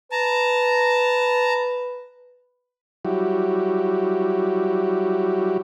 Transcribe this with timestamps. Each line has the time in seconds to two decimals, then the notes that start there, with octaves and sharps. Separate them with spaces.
0.12 B4 A5 A#5
3.05 F#3 G3 E4 F#4 G4